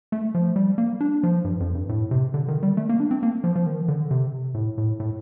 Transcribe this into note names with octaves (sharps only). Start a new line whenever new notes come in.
A3
F3
G3
A#3
D4
F3
G2
F2
G2
A2
C3
D3
D#3
G3
A3
A#3
D4
C4
A#3
F3
F3
D#3
D3
C3
A2
A2
A2